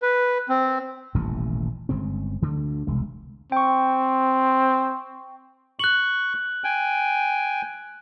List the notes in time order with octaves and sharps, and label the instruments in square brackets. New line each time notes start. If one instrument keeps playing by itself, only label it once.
[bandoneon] B4
C4
[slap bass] D#1 A1 A2 C3
G1 C#3 G#3 C4
D2 D3 A3
E1 C2 G#3
[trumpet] C4 [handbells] G5 C#6
[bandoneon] C#6 [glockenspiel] F#6 F#7
[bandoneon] G5 G#5